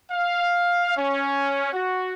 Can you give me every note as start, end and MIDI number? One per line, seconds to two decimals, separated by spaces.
0.11 0.94 77
0.97 1.72 61
1.73 2.14 66